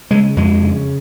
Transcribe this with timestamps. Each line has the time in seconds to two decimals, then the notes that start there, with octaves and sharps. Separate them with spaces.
0.10 C#3 G#3
0.36 F2 G#3
0.63 C#3